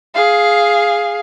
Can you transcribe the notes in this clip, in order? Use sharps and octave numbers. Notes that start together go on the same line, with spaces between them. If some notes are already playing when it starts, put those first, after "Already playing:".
G#4 F5